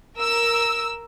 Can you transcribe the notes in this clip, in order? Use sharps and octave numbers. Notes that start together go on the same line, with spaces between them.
A#4 E6